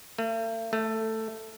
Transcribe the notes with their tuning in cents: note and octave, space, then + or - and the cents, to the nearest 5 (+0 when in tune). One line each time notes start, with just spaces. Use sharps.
A3 +45
A3 +10